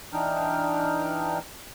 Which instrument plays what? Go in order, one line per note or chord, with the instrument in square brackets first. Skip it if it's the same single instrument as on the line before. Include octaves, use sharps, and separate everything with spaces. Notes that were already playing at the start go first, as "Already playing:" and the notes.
[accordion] E3 D4 D#4 G5 F6